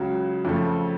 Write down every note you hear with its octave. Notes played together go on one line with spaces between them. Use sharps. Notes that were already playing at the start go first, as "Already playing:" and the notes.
Already playing: C#2 C#3 F#3
F2 C#3 F3 A3